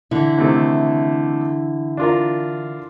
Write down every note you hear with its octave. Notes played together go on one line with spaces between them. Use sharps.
D3 E3 E4
C3 D#3 A3
D4 F4 A#4